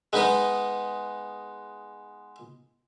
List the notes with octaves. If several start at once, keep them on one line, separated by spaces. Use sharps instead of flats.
G#3 B3 D#4 B4